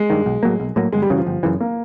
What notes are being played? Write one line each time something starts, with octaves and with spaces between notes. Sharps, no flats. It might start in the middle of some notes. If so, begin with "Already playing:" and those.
Already playing: G#3
G2 D#3
B1
A2 F#3 A#3
B1
A2 F#3 A#3
G1 G#3
G3
F#2 C#3 E3 F#3
F3
G1
F#2 C#3 E3
A#3